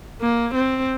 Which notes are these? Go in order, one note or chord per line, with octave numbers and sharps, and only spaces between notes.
A#3
C4